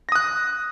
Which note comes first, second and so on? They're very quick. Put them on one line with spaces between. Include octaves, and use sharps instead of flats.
A#6 D#6 F#6